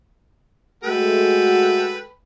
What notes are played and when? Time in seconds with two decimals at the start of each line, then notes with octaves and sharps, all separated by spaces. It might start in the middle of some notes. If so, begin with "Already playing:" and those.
0.84 G#3 A3 F#4 A4 B4 G5